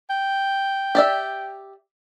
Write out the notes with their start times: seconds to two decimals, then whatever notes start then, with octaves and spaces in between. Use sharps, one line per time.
0.10 G5
0.95 G4 D5 E5